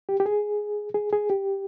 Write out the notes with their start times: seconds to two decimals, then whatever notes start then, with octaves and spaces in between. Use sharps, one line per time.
0.09 G4
0.20 G4
0.26 G#4
0.94 G#4
1.13 G#4
1.30 G4